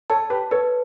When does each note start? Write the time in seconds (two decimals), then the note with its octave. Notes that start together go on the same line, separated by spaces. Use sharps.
0.10 A4 C#5 A5
0.30 G4 B4 A5
0.51 A4 B4 C#5